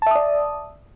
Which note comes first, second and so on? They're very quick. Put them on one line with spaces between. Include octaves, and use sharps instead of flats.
A5 E5 D#6 D5